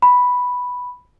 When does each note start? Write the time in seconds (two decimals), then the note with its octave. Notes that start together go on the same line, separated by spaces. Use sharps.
0.02 B5